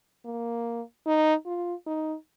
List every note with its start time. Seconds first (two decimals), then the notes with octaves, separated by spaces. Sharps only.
0.25 A#3
1.06 D#4
1.46 F4
1.86 D#4